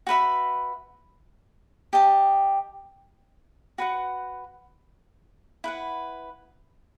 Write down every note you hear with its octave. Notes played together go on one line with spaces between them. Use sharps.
F#4 B4 E5 B5
G4 D#5 A5
F#4 B4 F#5
E4 B4 F#5